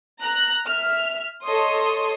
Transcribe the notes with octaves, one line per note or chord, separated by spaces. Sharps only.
A#5 F#6
E5 F6
A4 C#5 D#5 C6 D#6